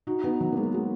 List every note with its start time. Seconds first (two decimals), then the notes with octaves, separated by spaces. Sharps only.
0.07 D#4 F#4
0.24 B3 D#4
0.40 F#3
0.52 A#3
0.57 G#3
0.74 G#3